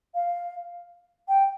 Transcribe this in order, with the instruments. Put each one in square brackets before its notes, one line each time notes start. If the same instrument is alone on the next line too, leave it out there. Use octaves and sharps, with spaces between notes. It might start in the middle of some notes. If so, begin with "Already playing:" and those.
[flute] F5
G5